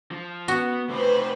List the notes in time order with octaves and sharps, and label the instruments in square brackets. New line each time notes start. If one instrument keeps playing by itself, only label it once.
[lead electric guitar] F3
[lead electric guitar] B3 [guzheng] F#4
[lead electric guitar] C3 A3 [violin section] B4 C5